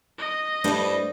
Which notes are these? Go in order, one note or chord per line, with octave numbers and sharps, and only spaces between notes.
D#5
G2 A3 E4 C5 D5